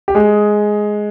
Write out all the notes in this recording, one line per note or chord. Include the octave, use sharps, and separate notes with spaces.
G4
G#3 G#4